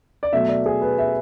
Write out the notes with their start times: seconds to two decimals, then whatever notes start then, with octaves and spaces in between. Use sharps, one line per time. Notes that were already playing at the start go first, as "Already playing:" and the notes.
0.23 D5
0.33 B2 F#3 A3 E5
0.49 D5
0.66 G#4
0.81 B4
0.98 E5